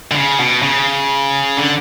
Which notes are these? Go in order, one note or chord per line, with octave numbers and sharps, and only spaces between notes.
D3
C#3
B2
C#3
D3